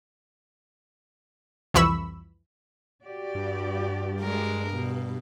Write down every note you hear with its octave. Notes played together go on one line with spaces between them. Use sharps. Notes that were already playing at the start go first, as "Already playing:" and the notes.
C2 F2 E3 B5 C#6 E6
F#4 G4 D5
G2
G#3 A#4
B2